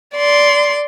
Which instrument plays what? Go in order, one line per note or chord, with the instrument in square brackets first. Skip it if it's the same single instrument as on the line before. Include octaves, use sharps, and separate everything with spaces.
[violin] D5 C6